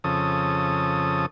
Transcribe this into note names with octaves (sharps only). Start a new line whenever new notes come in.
F2 C#3 A4 D#6